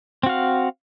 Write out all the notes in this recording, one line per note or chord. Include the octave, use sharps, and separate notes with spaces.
C4 F#4 F5